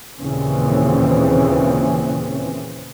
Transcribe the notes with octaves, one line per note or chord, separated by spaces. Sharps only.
D#2 A#2 C#3 E3 C4 C#4